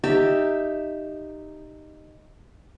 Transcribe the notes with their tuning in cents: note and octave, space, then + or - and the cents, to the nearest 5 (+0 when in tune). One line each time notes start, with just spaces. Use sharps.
D#4 -10 G4 +0 E5 +0